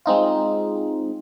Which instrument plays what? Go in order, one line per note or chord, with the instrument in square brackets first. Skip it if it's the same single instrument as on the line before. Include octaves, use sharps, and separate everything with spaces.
[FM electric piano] G#3 C4 D#4 F4